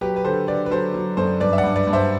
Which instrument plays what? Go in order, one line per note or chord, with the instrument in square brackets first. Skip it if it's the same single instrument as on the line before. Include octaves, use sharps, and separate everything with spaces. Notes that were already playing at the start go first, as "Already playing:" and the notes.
[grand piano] F#3 G4 B4
B4
D3 A4 C5
D3 B4 D5
B4
F#3 A4 C5
F#3
F#2 A4 C5
G2 B4 D5
E5
D5 F#5
G2
B4 D5
G2
C5 E5